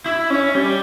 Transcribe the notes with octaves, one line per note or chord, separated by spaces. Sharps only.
E4
C#4
G3